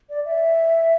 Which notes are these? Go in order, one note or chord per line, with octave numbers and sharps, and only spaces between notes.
D5
E5